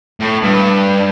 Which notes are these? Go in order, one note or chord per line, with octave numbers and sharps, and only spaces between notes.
A2
G2